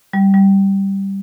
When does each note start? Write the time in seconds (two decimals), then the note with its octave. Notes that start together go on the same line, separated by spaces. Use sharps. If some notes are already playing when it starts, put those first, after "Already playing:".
0.13 G3
0.34 G3